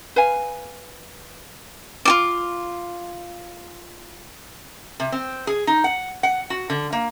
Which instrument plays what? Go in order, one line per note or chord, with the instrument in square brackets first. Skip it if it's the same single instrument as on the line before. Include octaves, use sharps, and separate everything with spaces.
[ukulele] B4 F5 G#5
[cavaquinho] F4 F#4 D6
[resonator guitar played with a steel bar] C3
C4
G#4
D#4
F#5
F#5
F#4
D3
A#3